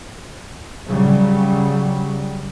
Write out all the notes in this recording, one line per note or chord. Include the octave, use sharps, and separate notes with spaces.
C#3 F#3 G3